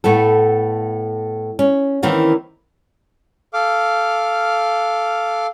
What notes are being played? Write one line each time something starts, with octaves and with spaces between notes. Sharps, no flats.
A2 A3 B3 A4
C#4
D#3 E3 A#3 C4 C#4
A4 F5 D6 F6